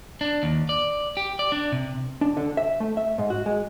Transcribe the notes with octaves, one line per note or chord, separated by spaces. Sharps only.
D4
D#2
D5
G4
D5
D4
C3
D4
D3
E5
A3
E5
G#2
F#4
G#3